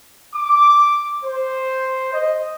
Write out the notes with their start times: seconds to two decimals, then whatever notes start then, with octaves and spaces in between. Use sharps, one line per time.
0.34 D6
1.24 C5
2.13 D#5